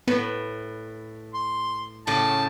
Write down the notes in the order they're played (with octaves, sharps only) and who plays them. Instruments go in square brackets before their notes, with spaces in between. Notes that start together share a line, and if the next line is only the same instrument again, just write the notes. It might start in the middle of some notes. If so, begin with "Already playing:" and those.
[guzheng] A2 B4 [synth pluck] B3
[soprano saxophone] C6
[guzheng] A2 C#3 G4 [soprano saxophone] A5